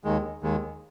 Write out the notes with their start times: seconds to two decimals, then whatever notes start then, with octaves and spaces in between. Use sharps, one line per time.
0.04 D#2 D#3 G#3
0.43 D#2 D#3 G#3